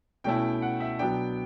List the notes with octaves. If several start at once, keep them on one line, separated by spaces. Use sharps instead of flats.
B2 A3 C#4 E4 G5
F#5
E5
B2 F#3 B3 D4 G5